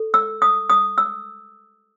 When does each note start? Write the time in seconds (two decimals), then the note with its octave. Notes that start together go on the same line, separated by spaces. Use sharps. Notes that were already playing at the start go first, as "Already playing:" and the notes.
Already playing: A4
0.14 E6
0.42 D#6
0.70 D#6
0.98 E6